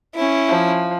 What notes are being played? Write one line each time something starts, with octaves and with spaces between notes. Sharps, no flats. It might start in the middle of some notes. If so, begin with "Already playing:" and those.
C#4 E4
F3